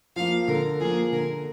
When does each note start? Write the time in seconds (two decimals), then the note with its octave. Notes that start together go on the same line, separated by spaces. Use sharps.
0.16 F3 A#3 F5
0.48 D3 A#4
0.80 F3 A#3 G#4
1.12 D3 A#4